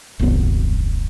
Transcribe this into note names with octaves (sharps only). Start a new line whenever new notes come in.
D#1 C2 F#2 B3